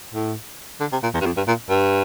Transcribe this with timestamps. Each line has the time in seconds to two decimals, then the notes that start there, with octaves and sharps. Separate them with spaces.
0.14 A2
0.81 D3
0.92 C3
1.03 A#2
1.14 E2
1.21 G2
1.26 F2
1.37 G2
1.48 A#2
1.70 G2